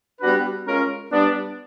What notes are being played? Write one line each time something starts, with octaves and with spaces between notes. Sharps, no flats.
G3 B3 D4 F#4 B4
G#3 C#4 F4 A#4
G3 B3 D4